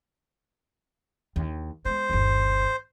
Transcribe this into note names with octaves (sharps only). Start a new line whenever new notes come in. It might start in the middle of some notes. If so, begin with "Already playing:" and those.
D#2 D3
G#3 B3 C5
G1 D#2